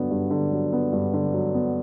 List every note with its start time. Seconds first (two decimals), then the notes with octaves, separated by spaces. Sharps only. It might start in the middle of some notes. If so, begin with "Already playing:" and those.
Already playing: G2 D3 F#3 B3
0.10 G2
0.31 D3
0.51 F#3
0.73 B3
0.93 G2
1.14 D3
1.34 F#3
1.54 B3